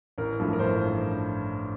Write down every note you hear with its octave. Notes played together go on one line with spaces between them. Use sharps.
A1 A#4
G2 F3 A3
A#4
A1 C5
F3